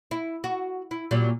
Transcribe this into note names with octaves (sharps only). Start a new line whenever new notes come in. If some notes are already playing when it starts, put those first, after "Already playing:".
E4
F#4
E4
A#2 F#3 G3